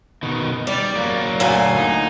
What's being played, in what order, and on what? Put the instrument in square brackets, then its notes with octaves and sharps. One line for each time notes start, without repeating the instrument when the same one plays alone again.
[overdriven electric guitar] B2 D#3
[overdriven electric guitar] G3 [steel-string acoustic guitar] D5
[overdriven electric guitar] F#3 A#3
[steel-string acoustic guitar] D2 A#2 G#5
[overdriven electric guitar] D#4